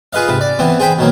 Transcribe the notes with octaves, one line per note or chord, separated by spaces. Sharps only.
F4 G#4 B4 D#5 F5
G#2 C3 B4
D5
E3 B3 C4
G#4 C5 G5 B5
B2 D#3 F#3 A#3